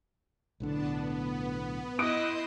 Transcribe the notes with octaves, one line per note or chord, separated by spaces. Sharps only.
B1 A2 D3 B3 D4 A5
B3
E4 D#5 C6 D#6 F#6 G6 D7